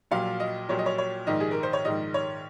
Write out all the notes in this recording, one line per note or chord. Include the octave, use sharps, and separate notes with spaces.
A#1 A#2 F#3 F5
D#5
A#1 A#2 F#3 C#5
D#5
C#5
C#5
A#1 G#2 D#3 D#5
G#4
A#4
C5
C#5
A#1 G#2 D#3 D#5
C#5